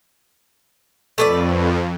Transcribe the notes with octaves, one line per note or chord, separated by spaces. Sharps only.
F2 A3 A4 B4 D5